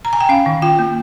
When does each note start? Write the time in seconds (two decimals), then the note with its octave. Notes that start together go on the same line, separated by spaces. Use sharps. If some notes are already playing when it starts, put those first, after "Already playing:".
0.05 A#5
0.13 G#5
0.21 G5
0.29 C#4 F5
0.46 D#3
0.62 F4 G5
0.79 A#3